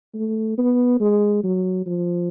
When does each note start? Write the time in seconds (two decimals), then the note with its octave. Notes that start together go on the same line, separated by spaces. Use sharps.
0.14 A3
0.58 B3
1.00 G#3
1.44 F#3
1.86 F3